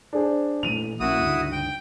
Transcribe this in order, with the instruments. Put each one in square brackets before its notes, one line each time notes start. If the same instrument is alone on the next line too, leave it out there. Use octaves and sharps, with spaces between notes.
[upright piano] D4 G#4 C5
[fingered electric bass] A#2 E3 A3 [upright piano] D#7 F7
[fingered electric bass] A#1 A#3 C#4 [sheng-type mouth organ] E4 F#4 D#6
[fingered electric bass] C#2 G2 D3
[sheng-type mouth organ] G5